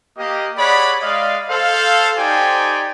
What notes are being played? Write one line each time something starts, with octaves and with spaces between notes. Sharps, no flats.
A#3 G4 D#5
G#4 C#5 D5 F#5 B5
G#3 D5 D#5 F5
A4 C5 F5
D#4 G4 C5 D5 G5 G#5